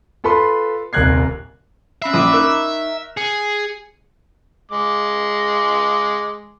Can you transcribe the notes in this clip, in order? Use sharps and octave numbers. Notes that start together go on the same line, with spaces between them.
F4 A4 B4 B5 C6
D#1 C2 A#4 F#6 G#6 C7
C#4 E5 B5 C7
A#1 B5 D6 D#6
D#4 A#4 C#6 E6 F#6
G#4 C#7
G#3 D6